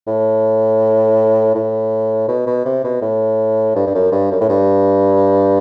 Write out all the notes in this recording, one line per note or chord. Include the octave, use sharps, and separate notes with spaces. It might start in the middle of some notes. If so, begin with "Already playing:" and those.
A2
A2
B2
B2
C3
B2
A2
G2
G2
F#2
G2
F#2
A2
G2